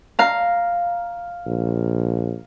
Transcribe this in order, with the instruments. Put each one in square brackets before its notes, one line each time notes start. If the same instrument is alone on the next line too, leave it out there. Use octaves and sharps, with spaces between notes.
[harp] F5 A#5
[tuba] A#1